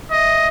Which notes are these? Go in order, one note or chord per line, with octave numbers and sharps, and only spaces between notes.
D#5 E5